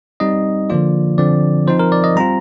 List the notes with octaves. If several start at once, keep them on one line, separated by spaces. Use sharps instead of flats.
G3 C4 D#4 D#5
D3 F3 A#3 F4 D5
D3 F3 C4 D5
F3 C4 D#4 C5
A#4
D5
D#5
G3 C4 F4 A#5